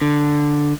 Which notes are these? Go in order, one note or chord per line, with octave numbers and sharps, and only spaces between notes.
D3